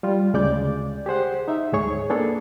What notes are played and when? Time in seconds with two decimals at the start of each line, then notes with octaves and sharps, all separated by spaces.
0.03 G3 F4
0.34 D2 C#3 G#3 D5 D6 G6
1.06 G4 G#4 C5 F#5
1.48 D#4 E5
1.73 D2 G#2 G#4 C#5 C#6
2.10 A#3 B3 D4 G#4 A4